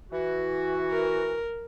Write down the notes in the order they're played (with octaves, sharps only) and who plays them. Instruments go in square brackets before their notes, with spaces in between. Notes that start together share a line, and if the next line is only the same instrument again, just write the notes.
[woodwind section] E3 F#4
[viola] A#4